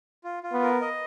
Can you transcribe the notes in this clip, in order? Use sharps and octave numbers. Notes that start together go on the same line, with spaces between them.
F4
F4
B3
A#4
D#5